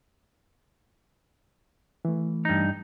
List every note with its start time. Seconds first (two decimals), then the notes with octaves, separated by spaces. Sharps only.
2.05 E3 A3
2.45 G2 D#4